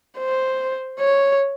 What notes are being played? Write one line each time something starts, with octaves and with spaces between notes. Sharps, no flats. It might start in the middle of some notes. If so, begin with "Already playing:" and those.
C5
C#5